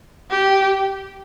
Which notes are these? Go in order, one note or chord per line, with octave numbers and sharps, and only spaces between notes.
G4